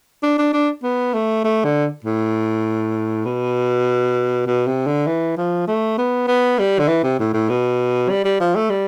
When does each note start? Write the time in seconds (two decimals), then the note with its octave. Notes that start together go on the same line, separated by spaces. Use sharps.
0.23 D4
0.38 D4
0.53 D4
0.83 B3
1.13 A3
1.44 A3
1.64 D3
2.04 A2
3.25 B2
4.46 B2
4.67 C3
4.87 D3
5.07 E3
5.37 F3
5.67 A3
5.98 B3
6.28 B3
6.59 G3
6.79 D3
6.88 E3
7.03 C3
7.19 A2
7.33 A2
7.49 B2
8.09 G3
8.25 G3
8.40 F3
8.55 A3
8.70 G3